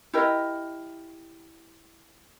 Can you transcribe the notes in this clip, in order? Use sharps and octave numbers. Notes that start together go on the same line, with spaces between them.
E4 G4 A#4 D#5